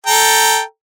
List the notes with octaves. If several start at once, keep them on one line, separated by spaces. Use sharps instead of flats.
A4 G5 A#5